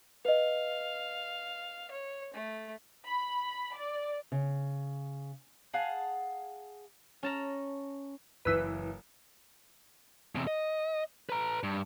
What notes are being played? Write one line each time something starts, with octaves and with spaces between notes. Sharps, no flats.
B4 D#5 F5
C#5
A3
B5
D5
C#3
G#4 F5 F#5 A5
C#4 A5 A#5
F#1 E3 B4 E6
E2 C3
D#5
B4 A#5
G2